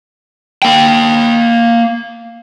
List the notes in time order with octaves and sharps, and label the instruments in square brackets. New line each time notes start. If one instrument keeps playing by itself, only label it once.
[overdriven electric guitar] A#3 G5